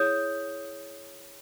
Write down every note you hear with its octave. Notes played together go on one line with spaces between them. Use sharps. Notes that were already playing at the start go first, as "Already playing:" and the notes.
Already playing: E4 G#4 C#5 D#6 G6